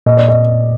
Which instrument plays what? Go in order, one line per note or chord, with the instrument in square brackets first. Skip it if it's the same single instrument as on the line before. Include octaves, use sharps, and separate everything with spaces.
[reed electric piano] A#2 [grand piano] D#5
[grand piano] D5
D#5